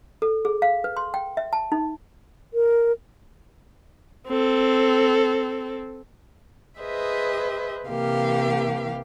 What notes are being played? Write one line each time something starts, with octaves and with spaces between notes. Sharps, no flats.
A4
G#4
F5
B4
C6
G5
E5
A5
D#4
A#4
C4 A4
G#4 B4 C5 D#5 E5
C3 E3 A#3 G4 F5